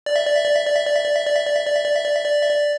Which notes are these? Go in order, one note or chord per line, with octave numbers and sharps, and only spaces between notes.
D5
E5
D5
E5
D5
E5
D5
E5
D5
E5
D5
E5
D5
E5
D5
E5
D5
E5
D5
E5
D5
E5
D5
E5
D5